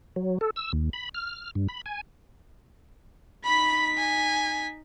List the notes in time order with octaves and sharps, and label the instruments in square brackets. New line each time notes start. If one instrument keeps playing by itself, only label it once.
[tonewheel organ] F#3
A4
E6
D#2
B5
F6
G2
B5
G#5
[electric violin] D#4 B6 [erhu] B5
[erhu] G#5